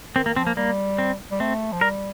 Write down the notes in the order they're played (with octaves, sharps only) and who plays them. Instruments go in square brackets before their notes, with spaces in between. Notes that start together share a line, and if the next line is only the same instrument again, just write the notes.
[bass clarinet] D#3 [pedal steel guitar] C4
[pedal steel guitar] A#3
[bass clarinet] D#3
[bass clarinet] F3 [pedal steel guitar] C4
[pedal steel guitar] A#3
[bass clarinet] G3 [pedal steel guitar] A#3
[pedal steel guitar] C4
[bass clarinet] G3
[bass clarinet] A3 [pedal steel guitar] C4
[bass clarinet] F3
[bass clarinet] G3 [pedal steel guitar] A#4